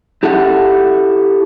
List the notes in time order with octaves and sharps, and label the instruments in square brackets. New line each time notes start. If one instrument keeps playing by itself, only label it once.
[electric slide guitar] E4 G4 A4 E5 F#5